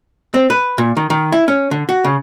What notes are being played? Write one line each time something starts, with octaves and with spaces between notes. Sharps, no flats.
C4
B4
A#2
D#3
D#3
E4
C#4
D3
F#4
C#3